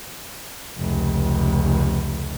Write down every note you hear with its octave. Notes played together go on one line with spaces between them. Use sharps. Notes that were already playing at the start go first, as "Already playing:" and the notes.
F1 C#2